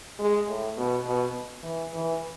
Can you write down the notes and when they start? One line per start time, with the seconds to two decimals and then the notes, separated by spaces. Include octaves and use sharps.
0.19 G#3
0.48 A2
0.77 B2
1.06 B2
1.63 E3
1.93 E3